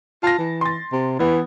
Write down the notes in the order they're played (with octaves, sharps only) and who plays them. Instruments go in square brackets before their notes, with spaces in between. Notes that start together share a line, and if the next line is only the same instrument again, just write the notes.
[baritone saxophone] F4 [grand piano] A5 A#6
[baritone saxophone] E3
[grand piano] C6 A6
[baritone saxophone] C3
[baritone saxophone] E3 [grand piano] B3 E4